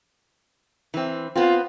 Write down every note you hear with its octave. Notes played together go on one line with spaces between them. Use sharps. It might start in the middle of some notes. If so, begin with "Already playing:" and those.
E3 C4
B3 C4 F4